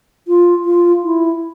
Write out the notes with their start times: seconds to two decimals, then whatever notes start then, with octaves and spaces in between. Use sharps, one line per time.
0.28 F4
0.66 F4
1.04 E4